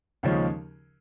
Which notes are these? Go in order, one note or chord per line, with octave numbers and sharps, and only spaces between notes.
D#2 C#3 F3 G#3 C#4